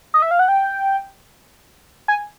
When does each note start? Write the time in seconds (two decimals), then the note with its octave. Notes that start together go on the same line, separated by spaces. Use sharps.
0.14 D#5
0.22 E5
0.31 F5
0.39 F#5
0.48 G5
2.08 G#5